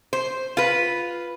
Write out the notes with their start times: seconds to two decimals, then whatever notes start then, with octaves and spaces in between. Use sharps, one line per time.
0.13 C5
0.57 F4 B4